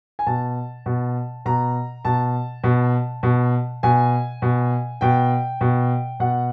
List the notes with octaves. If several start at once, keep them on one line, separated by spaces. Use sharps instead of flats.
G#5
B2 A5
B2
B2 A#5
B2 A5
B2
B2
B2 G#5
B2
B2 G5
B2
B2 F#5